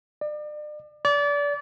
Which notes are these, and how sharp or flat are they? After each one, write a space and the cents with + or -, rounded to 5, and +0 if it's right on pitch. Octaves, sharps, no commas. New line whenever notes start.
D5 +35
D5 -30